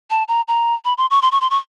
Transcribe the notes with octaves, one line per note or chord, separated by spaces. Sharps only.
A5
A#5
A#5
B5
C6
C#6
C6
C#6
C6
C#6